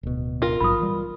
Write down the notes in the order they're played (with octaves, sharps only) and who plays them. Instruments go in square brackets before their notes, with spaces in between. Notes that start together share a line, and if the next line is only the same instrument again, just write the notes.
[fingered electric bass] D1 B2
[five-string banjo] F4 A#4
[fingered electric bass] A#1 G#2 F#3 [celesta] B5 D#6
[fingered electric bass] E3 G3